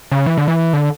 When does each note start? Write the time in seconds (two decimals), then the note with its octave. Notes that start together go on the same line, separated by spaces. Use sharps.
0.12 C#3
0.26 E3
0.38 D3
0.48 E3
0.73 D3